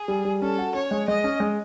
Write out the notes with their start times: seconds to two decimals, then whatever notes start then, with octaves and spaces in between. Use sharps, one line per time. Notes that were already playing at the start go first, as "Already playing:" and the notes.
Already playing: G#4
0.08 G3
0.25 G3
0.41 C#4 A4
0.59 F#4
0.75 C#4 C#5
0.91 G#3
1.08 G#3 D#5
1.24 C#4
1.40 G#3